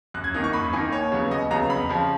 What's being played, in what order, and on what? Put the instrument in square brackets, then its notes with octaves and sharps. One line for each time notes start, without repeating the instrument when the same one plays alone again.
[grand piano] F#2 F#6
G#6
D#3 A#3 D#4 D#6
C#6
F#2 B5
D#3 A#3 D#4 G#5
D#2 C#5
C#3 F#3 B3
D#2 D#5
C#3 F#3 B3 A#5
F2 B5
C#3 F3